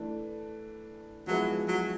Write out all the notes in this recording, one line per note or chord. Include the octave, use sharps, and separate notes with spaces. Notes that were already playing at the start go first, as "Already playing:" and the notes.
Already playing: E3 A3 D4
F3 F#3 G#3 B3 E4
F#3